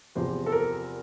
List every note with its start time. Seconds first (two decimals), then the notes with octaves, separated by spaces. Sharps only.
0.15 E2 C3 F3 C5
0.46 A4
0.52 A#4